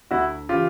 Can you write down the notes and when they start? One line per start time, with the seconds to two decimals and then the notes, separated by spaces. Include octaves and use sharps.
0.11 D2 E4 F#4
0.49 C#3 E3 F4 G4